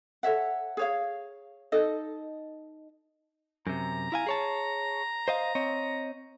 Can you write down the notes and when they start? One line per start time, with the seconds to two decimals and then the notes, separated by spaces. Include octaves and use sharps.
0.23 A4 C#5 E5 F#5
0.77 G#4 C#5 F5
1.72 D#4 A4 D#5
3.67 F#2 C3 A#5
4.12 E4 F5 G#5
4.27 G#4 C#5 A5
5.28 C5 D#5 F5
5.55 C4 C#5 D#5